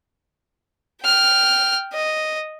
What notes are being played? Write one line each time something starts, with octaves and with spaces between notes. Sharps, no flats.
G5 F6
D#5